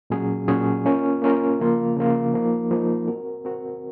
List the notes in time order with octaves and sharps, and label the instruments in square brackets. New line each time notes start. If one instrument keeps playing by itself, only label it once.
[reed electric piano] A#2 F#3 C#4 G#4
A#2 F#3 C#4 G#4
A#3 C#4 F4 A#4
A#3 C#4 F4 A#4
C#3 F3 A#3 F4
C#3 F3 A#3 F4
F3 A#3 D#4
F3 A#3 D#4
C4 F#4 A#4
C4 F#4 A#4